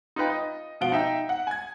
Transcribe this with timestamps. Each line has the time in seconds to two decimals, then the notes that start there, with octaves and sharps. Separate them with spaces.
0.16 D#4 F4 B4 G5
0.30 D#5
0.81 B2 F3 F5 F#5 D7 G7
0.92 D#4 E5 G5
1.29 F#5
1.47 G#5 G#6